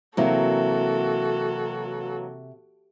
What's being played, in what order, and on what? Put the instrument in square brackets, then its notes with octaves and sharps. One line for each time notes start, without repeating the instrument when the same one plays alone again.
[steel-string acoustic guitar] C3 [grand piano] E3 F#3 A#3 [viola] F#4 A4